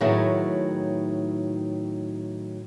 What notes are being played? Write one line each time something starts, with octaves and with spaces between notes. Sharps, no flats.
A2 D#3 F#3 B3 E4 G#4